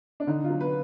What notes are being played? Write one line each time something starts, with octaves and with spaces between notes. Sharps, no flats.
D4
D3 D#4
F4
F#3
B4